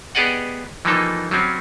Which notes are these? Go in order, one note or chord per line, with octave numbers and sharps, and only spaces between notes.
B3 G4 G#4 D5 D#5 F#5
E3 F3 G3 A#3 D#4 A4
F#3 G3 C4 C#4